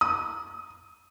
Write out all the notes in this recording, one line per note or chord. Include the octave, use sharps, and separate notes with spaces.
D#6